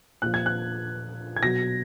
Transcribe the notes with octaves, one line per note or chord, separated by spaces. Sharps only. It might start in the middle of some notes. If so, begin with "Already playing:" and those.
A#2 F3 F#6
G#6
F#6
G#6
B2 F#3 A#6